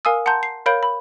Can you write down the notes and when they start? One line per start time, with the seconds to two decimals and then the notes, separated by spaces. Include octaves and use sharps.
0.05 A#4 F5 G#5 D#6 E6
0.26 F#5 A5 A#5 C6 G6
0.43 C7
0.66 A#4 C#5 F5 B5 G6 D7
0.83 B5